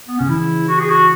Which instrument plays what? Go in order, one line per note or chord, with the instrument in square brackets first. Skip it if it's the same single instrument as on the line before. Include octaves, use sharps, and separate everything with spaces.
[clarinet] B3
[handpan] C#3 [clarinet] C#4
[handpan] E3 [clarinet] E4
[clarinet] F#4
G#4
F#4